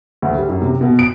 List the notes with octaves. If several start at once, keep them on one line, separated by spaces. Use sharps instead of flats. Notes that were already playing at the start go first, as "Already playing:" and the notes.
D2
G3
F#2
C3
B2
D7